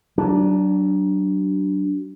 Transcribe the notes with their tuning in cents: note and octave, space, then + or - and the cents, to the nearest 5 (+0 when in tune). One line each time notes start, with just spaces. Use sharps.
F#3 +30 D4 -5